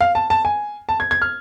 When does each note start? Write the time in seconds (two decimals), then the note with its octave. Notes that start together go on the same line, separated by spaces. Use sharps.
0.01 F5
0.15 A5
0.30 A5
0.45 G#5
0.89 A5
1.00 G#6
1.11 G#6
1.22 F6